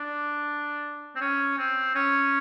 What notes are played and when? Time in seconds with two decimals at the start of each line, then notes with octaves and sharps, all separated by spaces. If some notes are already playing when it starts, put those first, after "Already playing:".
Already playing: D4
1.16 C4
1.21 C#4
1.58 C4
1.95 C#4